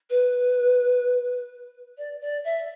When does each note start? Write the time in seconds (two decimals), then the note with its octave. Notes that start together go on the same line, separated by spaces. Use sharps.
0.10 B4
1.98 D5
2.21 D5
2.44 E5